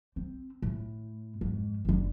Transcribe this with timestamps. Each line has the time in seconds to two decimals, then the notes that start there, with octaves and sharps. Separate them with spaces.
0.16 C4
0.62 A2
1.41 F2 G#2
1.85 F#1 D3